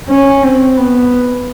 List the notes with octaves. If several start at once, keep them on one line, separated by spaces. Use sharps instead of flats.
C#4
C4
B3